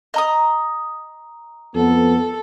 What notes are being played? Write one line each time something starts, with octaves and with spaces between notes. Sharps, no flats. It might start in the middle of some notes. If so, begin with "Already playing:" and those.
D#5 A#5 D#6
F2 B3 A4